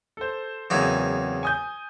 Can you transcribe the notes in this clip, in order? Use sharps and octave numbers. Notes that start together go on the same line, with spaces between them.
A4 C5
E2 C#3 F#3 A#3 C4 D#4
G#5 D#6 G6